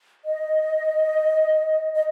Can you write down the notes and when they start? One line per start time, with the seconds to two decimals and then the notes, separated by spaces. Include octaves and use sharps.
0.24 D#5
1.95 D#5